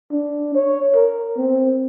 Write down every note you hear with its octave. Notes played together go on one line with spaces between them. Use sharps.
D4
C#5
A#4
C4